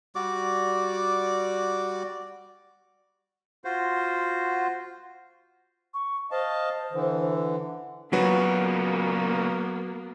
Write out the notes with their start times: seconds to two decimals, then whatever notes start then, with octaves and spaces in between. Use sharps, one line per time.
0.15 G3 F#4 D5 D6
3.65 F4 F#4 C5
5.94 C#6
6.32 C5 D#5 F5 A5
6.92 D3 E3
8.13 A#2 C#3 F#3 A#3 B3 F#4 B4